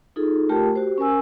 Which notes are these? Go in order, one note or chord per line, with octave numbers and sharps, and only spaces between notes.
D#4 F4 G#4 A4
A3 F4 G4 A#4 G5 A5
F#4 G4 C5
C#4 A#4 G#5 E6